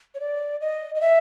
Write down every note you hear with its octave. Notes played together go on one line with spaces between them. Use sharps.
C#5
D5
D#5
D#5
E5